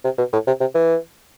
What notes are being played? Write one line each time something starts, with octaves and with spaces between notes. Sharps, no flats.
C3
B2
A2
C3
C3
E3